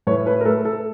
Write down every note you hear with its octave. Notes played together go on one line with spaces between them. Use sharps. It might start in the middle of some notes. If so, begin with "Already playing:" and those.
A2 B4 C#5
B4 C#5
A#4
A3 A4 B4
A4